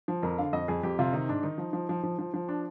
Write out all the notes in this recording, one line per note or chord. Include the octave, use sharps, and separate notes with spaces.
F3
F2 A#4
D3 F5
F2 D#5
F2 G#4
F2 G4
C3 F4
D#3 D#4
G#2 D4
D#3 D#4
F3
F3
F3
F3
F3
F3
D4